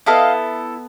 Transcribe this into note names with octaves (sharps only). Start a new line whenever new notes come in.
B3 E4 A4 D#5 F5